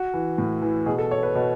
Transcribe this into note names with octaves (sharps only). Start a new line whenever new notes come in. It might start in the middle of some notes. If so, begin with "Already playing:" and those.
Already playing: F#4
E3
A2
E3
B2 G#4
A4
C#5
B4
B2